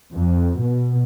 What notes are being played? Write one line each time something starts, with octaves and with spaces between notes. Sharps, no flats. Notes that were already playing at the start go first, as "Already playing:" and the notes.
F2
B2